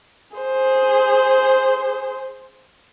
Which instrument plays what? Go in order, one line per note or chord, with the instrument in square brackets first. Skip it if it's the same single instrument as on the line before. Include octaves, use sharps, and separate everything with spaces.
[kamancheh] G#4 C5